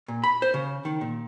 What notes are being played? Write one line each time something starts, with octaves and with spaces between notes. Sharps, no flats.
A#2
B5
C5
C#3
D#3
A#2